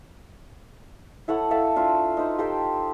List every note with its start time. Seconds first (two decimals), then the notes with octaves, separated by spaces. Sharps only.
1.28 E4 A4 C#5 F#5
1.51 A4 E5 F5 A5
1.76 D4 F4 E5
2.17 D#4 B4 C5
2.39 G4 A4 C5 G5